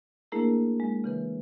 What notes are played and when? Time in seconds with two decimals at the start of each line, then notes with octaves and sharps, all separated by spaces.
0.32 A3 A#3 D4 E4 G#4 A#4
0.80 G#3
1.04 C#3 E3 B4